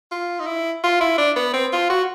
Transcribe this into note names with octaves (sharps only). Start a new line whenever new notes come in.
F4
D#4
E4
F4
E4
D4
B3
C4
F4
F#4